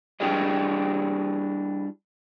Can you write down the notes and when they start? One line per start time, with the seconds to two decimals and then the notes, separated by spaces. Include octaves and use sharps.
0.20 G3 D4 E4 G4 G#4 D#5